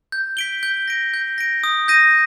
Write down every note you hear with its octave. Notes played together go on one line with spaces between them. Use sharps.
G6
B6 D7 G7
G6
A#6 D7
G6
A#6 D7
D#6
G6 A#6 D#7